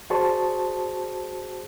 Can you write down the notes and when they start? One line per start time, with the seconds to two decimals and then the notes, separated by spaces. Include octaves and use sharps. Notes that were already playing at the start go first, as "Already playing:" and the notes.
0.10 F#4 G#4 C5 D5 A5 C#6